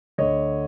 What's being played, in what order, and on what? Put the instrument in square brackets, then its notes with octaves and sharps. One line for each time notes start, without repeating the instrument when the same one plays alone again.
[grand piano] D2 D3 C#5 D#5